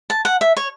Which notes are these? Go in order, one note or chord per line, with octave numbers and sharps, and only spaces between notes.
A5
F#5
E5
C#5